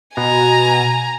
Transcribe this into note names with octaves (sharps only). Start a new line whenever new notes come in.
B2 G#5 A#5